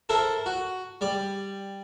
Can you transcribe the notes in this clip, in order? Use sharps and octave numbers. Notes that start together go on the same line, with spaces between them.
E4 A4 A#4 C5
F#4
G3 D5